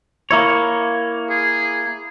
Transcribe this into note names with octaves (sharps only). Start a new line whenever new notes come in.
A#3 E4 C#5
G#4